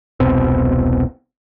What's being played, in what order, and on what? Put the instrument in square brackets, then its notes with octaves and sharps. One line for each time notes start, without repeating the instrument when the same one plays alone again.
[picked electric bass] E1 C2 B2 C4